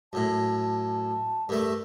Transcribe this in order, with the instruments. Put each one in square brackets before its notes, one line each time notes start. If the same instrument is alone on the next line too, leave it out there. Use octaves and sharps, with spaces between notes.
[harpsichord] F#2 A2 [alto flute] A5
[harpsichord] G2 A3 [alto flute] A#4